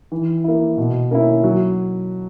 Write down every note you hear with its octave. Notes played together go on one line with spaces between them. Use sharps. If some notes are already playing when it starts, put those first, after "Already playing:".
E3
A#3 E4
B2
A#3 C#4 E4
F#3